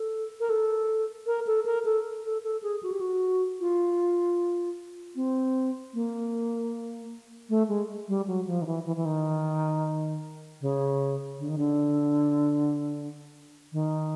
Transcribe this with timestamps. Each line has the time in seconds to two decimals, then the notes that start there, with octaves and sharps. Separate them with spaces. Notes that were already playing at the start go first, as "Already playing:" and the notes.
Already playing: A4
0.40 A#4
0.50 A4
1.26 A#4
1.47 A4
1.65 A#4
1.85 A4
2.24 A4
2.44 A4
2.63 G#4
2.83 F#4
2.92 G4
3.01 F#4
3.61 F4
5.16 C4
5.94 A#3
7.49 A3
7.69 G#3
8.08 G3
8.27 F#3
8.47 F3
8.62 D#3
8.66 E3
8.86 E3
8.96 E3
9.05 D#3
10.61 C#3
11.39 D3
11.49 D#3
11.58 D3
13.72 D#3